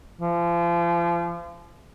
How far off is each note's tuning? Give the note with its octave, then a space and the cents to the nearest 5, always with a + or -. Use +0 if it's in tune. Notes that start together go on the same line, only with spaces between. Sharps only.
F3 -35